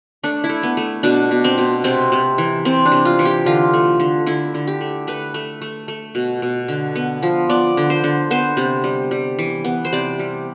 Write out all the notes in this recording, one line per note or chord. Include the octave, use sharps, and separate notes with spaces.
A3 D4
E4
A3
B3
A3
B2 D4
B2
C4
B2
C3 C4
C3
E3
C3 C4
D4
C3
F4
E3
G4
D3 F4
A3
D3
D3 E4
D3
G4
A3
A3 B4
A3
A3
A3
B2
B2
D3
B3
F3
B3 D5
D3
C5
D3
B3 C5
C3
G3
G3
E3
B3
C5
C3 D5
G3